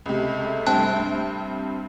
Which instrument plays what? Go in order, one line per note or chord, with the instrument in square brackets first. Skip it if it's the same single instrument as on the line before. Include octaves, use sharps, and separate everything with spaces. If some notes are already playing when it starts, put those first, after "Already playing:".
[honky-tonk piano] C#2 C3 [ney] A3
[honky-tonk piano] G2 C3 C4 [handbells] G5 A5 F#6